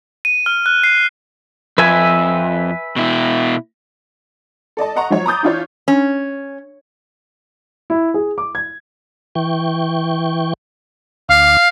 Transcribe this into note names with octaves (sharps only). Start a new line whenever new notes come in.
D#7
F6
F#6
C7
F2 B4 E5 G#5
B2 E4
A4 D5 D#5 A5
D#5 F#5 A#5 C#6
F3 F#3 C#5
A#5 B5 D6 D#6 G6 A6
E3 D4 E4 F4 C#5 D5
C#4
E4
G#4
D6
G#6
E3 G5 C#6
D2 F5 D6 F6